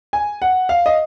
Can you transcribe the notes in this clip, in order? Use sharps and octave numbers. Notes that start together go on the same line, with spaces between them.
G#5
F#5
F5
D#5